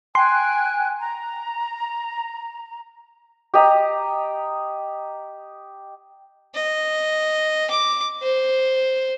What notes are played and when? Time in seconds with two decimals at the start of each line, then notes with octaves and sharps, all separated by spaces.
0.15 G5 G#5 C6 F#6
1.00 A#5
3.54 G4 D#5 A#5
6.55 D#5
7.70 D6
8.22 C5